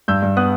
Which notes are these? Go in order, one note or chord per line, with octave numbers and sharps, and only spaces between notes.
G2 E6 G6
G2
B3 D#6 F#6